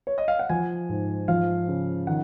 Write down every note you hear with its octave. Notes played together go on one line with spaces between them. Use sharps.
C#5
D#5
F5
F#5
F3 G#5
G#2
F3 F5
C#3
D#3 F#5